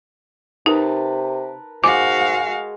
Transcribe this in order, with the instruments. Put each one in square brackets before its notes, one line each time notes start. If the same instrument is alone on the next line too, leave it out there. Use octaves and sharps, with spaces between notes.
[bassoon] C3 [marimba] D#4 [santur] A#4 B4 A5
[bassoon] G#2 [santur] G#3 [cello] F#4 F5 [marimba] D6